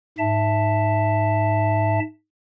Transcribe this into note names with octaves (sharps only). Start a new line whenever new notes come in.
G#2 E5 A5